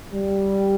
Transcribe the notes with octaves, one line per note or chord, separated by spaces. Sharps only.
G3